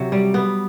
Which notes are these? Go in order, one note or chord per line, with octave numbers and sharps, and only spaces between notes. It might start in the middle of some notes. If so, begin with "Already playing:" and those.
Already playing: C3 F#3 C4
G3
B3